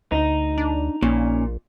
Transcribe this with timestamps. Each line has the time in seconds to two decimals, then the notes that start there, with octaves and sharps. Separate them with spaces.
0.12 D2 D#4
0.58 D4
1.02 A#1 A#2 C#4